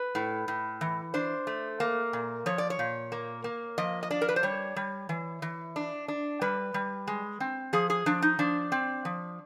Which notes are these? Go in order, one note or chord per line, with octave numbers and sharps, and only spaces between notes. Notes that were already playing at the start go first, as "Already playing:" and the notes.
Already playing: B4
A2
A2
E3
D4 C5
A3
A#3
A#2
F3 C#5
D5
C#5
A#2
A#3
A#3
F3 D#5
D#5
D4 D5
A#4
B4
C5
G3 C#5
G3
E3
E3
D4
D4
G3 B4
G3
G#3
C4
F3 G#4
G#4
F3 D4
D#4
F3 D4
C4
F3